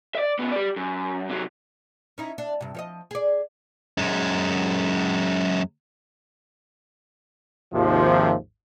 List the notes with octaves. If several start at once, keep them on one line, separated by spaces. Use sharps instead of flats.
D5 E5
C#3 B3
G4 D5
F#2
C3 F#3
C#4 D#4 E4
D4
G2 C3
F3 C#5 D#5
G#4 D5
F#2 G#3
G#1 D#2 C3 F3